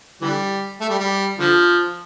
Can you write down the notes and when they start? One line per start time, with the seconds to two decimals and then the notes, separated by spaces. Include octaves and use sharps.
0.22 D3 E3 G3
0.81 A3
0.89 G3
1.00 G3
1.39 D3 F3